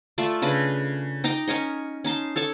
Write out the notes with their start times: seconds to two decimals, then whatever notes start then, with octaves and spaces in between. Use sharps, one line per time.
0.18 A3 F4 D5 E5
0.42 C#3 D4 B4
1.24 D#4 G5 A#5 D6
1.47 C#4 A#4 C#5 D#5
2.04 C#4 D#4 A5 C6
2.36 A4 C#5 A5